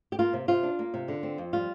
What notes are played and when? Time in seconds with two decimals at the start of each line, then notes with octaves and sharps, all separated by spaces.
0.12 G4
0.19 A#3 F4
0.33 C3
0.48 C3 F4
0.63 D4
0.79 A#3
0.94 C3
1.08 D3
1.23 C4
1.38 F2
1.53 G3 F4